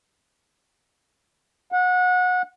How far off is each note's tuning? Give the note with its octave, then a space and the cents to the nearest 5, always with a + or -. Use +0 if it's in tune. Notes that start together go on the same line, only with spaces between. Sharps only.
F#5 -25